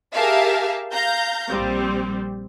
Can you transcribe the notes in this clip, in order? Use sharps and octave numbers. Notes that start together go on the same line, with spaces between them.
G4 G#4 A#4 E5 F5 A5
F5 A#5 G6
A#1 G3 C4